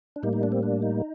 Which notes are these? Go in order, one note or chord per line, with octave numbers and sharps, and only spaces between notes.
D4
A2 G3 A#3 D#4
D#4
D4
C4
D4
D#4